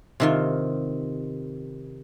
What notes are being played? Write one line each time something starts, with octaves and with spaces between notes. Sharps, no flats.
C3 D#3 F4